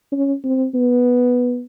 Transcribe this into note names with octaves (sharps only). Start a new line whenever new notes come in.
C#4
C4
B3